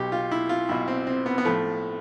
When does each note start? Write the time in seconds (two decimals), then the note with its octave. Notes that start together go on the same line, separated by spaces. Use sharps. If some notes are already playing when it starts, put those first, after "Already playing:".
Already playing: B1 B2 G4
0.12 F4
0.31 E4
0.49 F4
0.69 B1 B2 E4
0.88 C4
1.07 C4
1.26 B3
1.38 B3
1.45 A2 F3 A3